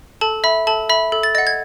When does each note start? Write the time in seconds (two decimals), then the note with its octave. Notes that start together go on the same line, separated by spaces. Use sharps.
0.21 A4 A5
0.44 E5 B5
0.67 A4 A5
0.89 E5 B5
1.12 A4
1.23 A6
1.35 D#5 F#5 A6
1.47 G#6